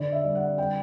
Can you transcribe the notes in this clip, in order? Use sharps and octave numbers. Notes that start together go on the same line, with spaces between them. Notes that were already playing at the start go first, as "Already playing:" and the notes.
Already playing: D3 D5
E5
G3
F#5
G3 G5